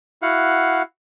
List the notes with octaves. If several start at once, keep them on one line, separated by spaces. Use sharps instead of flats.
E4 F#4 F5 F#5